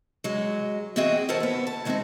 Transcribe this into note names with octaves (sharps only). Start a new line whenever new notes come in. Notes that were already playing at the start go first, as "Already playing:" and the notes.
F#3 G#3
E2 C4 F#4 G#4 D#5 G5
A4 A#4 C5 C#5 F#5 A5
D#2 B3
A5
D#3 G#3 A3 B3 C4 D#4